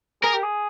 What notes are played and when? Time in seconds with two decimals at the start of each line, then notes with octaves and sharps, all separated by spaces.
0.23 G#4 A#4
0.34 G4
0.43 G#4